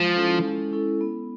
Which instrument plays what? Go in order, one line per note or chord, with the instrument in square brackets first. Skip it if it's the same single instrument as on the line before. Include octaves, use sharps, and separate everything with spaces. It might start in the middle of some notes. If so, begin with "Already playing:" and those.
Already playing: [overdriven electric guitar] F3 [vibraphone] G#3
[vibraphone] C#4 E4 A4
G#3
C#4 E4 A4
B3